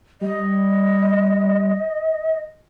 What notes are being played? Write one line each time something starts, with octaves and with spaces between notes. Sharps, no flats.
G3 D#5